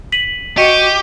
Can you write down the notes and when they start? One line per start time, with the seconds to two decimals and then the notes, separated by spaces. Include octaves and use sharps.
0.12 B6 D#7 F#7
0.57 F#4 G4 D#5 C#6 C#7 D#7